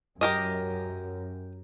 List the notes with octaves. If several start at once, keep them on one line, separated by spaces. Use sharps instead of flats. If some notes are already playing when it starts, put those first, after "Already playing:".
F#2 G4 A#4 D#5